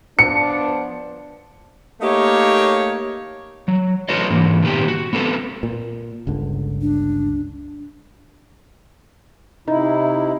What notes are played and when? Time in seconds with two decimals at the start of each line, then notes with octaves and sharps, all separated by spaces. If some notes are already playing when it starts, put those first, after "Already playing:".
0.19 F3 B3 D4 C#7
2.01 A3 A#3 D#4 G4 C#5
3.68 F#3
4.09 F4 F#4 A4 B4 C#5 D#5
4.30 G#2 E3 A#3
4.62 A#2 D#3 B3 G4
4.88 F#4
5.13 B3 C4 A4 B4
5.63 A#2
6.27 G1 C#2 D3
6.81 D4
9.68 C3 D#4 E4